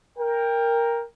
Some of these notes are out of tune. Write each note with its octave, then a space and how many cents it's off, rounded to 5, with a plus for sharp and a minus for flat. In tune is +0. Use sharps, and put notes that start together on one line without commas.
A#4 +0 G5 +20